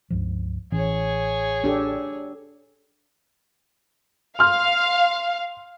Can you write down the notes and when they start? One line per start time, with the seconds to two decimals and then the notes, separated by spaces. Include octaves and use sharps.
0.10 C#2 G2 F3
0.72 A1 E3 C#4 G#4 C#5
1.64 D4 G4 A4
4.39 F5 C6 F6